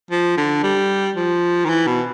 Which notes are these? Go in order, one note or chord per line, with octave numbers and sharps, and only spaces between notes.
F3
D3
G3
F3
D#3
E3
B2